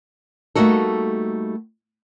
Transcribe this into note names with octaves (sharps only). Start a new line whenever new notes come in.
G3 A3 A#3 D#4 F#4 A4